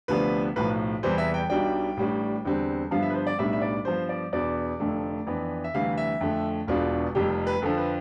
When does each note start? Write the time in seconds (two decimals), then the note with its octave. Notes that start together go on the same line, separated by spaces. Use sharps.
0.08 D2 C3 F3 B3 D4 B4
0.56 B1 A2 F3 B4
1.03 E2 C3 E3 G3 C5
1.18 E5
1.34 G5
1.50 B1 B2 G3 D4 G5
1.97 A1 A2 G3 D4
2.45 E2 D3 G3 C4
2.91 G2 D3 F3 B3 F5
3.02 E5
3.10 B4
3.14 C5
3.27 D5
3.38 B1 A2 G3 B3 D4 E5
3.53 E5
3.62 D5
3.85 G2 F3 B3 C5
4.09 D5
4.33 E2 B2 B3 D4 D5
4.80 F1 F2 D3 A3
5.27 F2 E3 B3 D4
5.64 E5
5.74 D2 C3 E3 G3 F5
5.98 E5
6.21 F2 D3 A3
6.68 E1 E2 B2 B3 D4 F4
7.15 F1 F2 C3 G3 G4
7.47 B4
7.62 F2 D3 F3 A4
7.78 B4